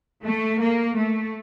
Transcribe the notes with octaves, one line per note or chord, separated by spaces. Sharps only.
A3
A#3
A3